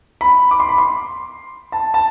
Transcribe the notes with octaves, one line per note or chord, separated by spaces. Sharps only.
B5
D6
C6
B5
C6
A5
A5